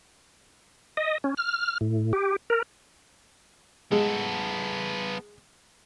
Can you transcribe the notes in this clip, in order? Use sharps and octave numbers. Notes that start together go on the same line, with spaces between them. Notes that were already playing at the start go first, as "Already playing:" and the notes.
D#5
C#4
F6
A2
G4
A#4
G#3 B3 A4